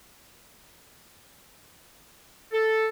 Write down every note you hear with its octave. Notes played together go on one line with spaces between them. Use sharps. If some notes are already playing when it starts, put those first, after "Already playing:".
A4